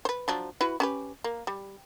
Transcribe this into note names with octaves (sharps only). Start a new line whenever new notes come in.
B4 C5
F3 F#3 D4
E4 F#4 B4
C#4 G4 B4
A#3
G3